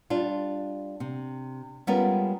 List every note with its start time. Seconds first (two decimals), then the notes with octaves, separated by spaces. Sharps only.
0.10 G3 D4 F4
1.00 C3
1.87 G3 G#3 B3 C#4 F4 A#4